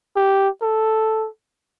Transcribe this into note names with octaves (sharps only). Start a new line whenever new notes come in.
G4
A4